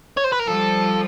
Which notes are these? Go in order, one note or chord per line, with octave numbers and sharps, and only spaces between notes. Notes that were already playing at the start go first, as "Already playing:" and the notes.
C#5
C5
B4
A#4
F3 G3 A4